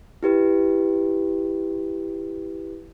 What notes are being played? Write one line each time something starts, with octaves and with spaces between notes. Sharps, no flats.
E4 G4 B4